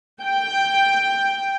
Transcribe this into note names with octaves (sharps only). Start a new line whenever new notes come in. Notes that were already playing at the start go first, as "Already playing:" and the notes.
G5